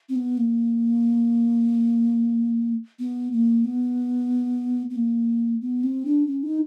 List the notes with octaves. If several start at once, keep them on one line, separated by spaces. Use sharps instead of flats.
C4
B3
A#3
B3
A#3
B3
B3
A#3
B3
C4
D4
C#4
D#4